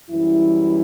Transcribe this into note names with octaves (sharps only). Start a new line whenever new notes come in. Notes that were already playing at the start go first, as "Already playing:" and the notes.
F#2 E3 G3 E4